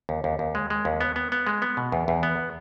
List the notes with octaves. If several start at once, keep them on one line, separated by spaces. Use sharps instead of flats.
D#2
D#2
D#2
G#3
G#3
D#2
B3
B3
B3
G#3
B3
B2
E2
E2
B3